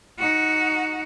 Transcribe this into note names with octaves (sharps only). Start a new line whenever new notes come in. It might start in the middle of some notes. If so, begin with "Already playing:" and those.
D#4 F#4